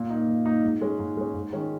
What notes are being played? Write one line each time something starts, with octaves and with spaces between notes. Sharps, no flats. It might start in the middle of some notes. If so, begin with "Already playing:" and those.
Already playing: A#2
D#4
A#3
A#2
A#3 D#4
G#2
G#3 C#4
G#2
G#3 C#4
G#2
D#3 G#3 C#4